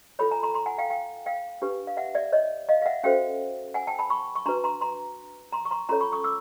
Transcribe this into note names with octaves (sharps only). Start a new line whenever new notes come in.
F4 A4 C#5 B5
G#5 A#5
A#5 C6
A#5 C6
F#5 G#5
F5 G5
F5 G5
F5 G5
D4 G4 B4
F5
E5 F#5
D5 E5
C#5 D#5
D#5 F5
F5
E5 F#5
C#4 F#4 A4 C5 F5 G5
F#5 G#5
G5 A5
A5 B5
B5 C#6
C#6
D4 F#4 B4 A#5 C6
A#5 C6
A#5 C6
A#5 C6
C#6
A#5 C6
C#4 F4 A4 C#5 A#5 C6
B5 C#6
C#6 D#6
D6 E6